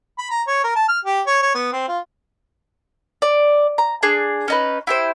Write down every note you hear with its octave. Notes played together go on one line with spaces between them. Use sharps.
B5
A#5
C#5
A#4
A5
F6
G4
C#5
C#5
B3
C4
F4
D5
A#5
D4 G#4
C#4 D#4 B4
E4 G4 C5